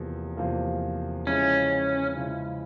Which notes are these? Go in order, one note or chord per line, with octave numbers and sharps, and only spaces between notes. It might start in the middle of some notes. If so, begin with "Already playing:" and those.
Already playing: E2 C3 F3 A#3
E2 C3 F3 A#3
C#3 F3 G#3 C#4 E4
C#3 F3 G#3 E4